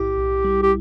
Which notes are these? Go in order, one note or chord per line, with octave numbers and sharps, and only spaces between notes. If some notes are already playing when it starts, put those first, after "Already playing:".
Already playing: B1 A2 E4 G4
B1
G3
G4